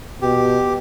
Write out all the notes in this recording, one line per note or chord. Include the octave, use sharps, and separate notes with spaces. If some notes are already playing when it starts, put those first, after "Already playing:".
B2 G4